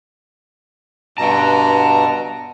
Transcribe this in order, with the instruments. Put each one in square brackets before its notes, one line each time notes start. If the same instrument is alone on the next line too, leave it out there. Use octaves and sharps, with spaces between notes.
[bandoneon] G2 B2 A#5 [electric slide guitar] F#5 A5